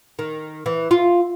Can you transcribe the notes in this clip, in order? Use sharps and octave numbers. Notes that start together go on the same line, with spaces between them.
D#3
E3
F4